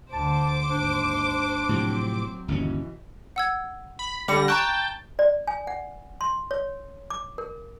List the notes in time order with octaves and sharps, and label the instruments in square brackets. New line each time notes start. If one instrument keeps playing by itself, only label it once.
[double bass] D2 D3 [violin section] C5 D6 [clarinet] A5
[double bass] G#1 D#2 [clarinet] D4
[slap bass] A2 C3 F3 [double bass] F#3 C4
[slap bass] G1 D#2 C#4 [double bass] B2 E3
[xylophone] F#5 E6 G#6
[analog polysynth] B5
[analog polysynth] D3 G3 A#6 [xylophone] B5 D6 C#7
[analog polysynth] G5 A5 [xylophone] A#5 C#6 F#6
[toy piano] D5
G#5
F#5
C6
C#5
D6
A#4